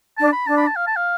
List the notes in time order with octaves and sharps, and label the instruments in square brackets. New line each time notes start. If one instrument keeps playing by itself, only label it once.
[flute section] D4 [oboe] A5
[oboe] B5
[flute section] D4 [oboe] A5
[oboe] B5
A5
F5
A5
F5